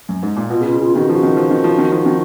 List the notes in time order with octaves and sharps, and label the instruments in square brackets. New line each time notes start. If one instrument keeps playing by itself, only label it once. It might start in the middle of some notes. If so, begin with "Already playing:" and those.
[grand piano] F#2
G#2
A#2
[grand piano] B2 [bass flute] F4
[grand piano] C#3
[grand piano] B2 [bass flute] F4
[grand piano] C#3 [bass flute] F4
[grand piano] D#3 [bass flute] F#4
[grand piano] F3 [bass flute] F#4
[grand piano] D#3
F3
D#3
F3
D#3
F3
D#3